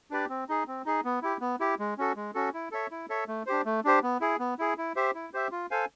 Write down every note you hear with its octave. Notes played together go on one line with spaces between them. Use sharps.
D4 G4 B4 D5
C4
D#4 G#4
C4
D#4 G#4
B3
E4 G4
B3
E4 G4
G#3
C#4 F#4 A4
G#3
C#4 F#4 A4
E4
A4 C#5 E5
E4
A4 C#5 E5
A3
D4 G4 C5
A3
D4 G4 C5
B3
E4 G#4
B3
E4 G#4
E4
G4 C5 E5
E4
G4 C5 E5
F4
A4 C5 F5 G#5